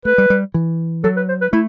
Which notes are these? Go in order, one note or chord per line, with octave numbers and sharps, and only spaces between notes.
A3 B4
G3
G3
E3
F#3 A4
B4
C5
B4
A3 E4